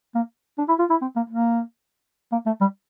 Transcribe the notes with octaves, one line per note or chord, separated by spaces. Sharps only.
A#3
D4
E4
F4
E4
C4
A#3
A#3
A#3
A3
G3